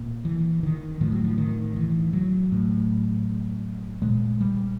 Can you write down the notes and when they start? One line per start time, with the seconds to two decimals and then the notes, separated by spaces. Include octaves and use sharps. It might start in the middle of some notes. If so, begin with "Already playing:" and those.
Already playing: A#2
0.25 E3
0.63 D#3
1.01 A2 F3
1.12 F#3
1.24 F3
1.38 D#3
1.76 E3
2.13 F#3
2.52 A2
4.02 A#2 G#3
4.41 G3